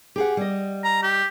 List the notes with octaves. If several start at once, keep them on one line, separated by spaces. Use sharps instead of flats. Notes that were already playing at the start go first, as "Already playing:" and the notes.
G4 G#4 F#5
G3 D#5
A#5
G4